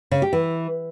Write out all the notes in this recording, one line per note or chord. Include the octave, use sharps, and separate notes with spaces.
C#3
G4
E3